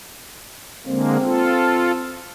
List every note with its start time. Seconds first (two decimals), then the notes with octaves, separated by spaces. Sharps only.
0.86 D3 G#3 A#3 C4
1.24 F4 A4